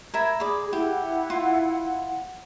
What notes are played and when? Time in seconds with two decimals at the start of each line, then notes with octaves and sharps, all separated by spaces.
0.14 A#4 E5 B5 G#6
0.40 G#4 D5 B5
0.73 E4 G4 F#5
1.30 F4